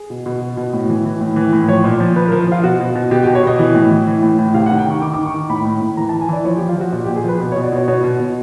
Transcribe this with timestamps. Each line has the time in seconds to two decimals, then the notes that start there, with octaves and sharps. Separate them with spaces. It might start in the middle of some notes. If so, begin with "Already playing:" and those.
Already playing: G#4
0.10 B2
0.26 B2
0.41 B2
0.57 B2
0.73 A2
0.89 E3
1.05 E3
1.21 A2
1.36 E3
1.53 A2
1.68 F3 C#5
1.84 A#2
2.00 F3
2.16 F3 B4
2.28 A#4
2.32 F3
2.47 F3 F4
2.63 B2 F#4
2.80 B2
2.95 B2
3.11 B2 G4
3.23 G4
3.27 B2
3.35 C#5
3.43 B2 D#5
3.59 E3
3.75 A2
3.91 E3
4.07 E3
4.23 A2
4.39 A2
4.54 C3 F5
4.66 F#5
4.70 D#3
4.78 G5
4.86 D#3 C#6
5.02 D#3 D6
5.14 D6
5.18 D#3
5.26 C#6
5.34 D#3
5.49 A2 B5
5.65 A2
5.81 A2
5.97 E3 A#5
6.09 A5
6.13 E3
6.21 G#5
6.29 E3 D5
6.45 F3 C#5
6.57 G4
6.61 F3
6.69 F4
6.76 F3 F#4
6.92 A#2 F#4
7.04 G4
7.08 A#2
7.16 G#4
7.24 F3 B4
7.40 B2
7.52 C#5
7.56 B2
7.64 D5
7.72 B2 C#5
7.88 B2 C#5
8.04 B2
8.20 B2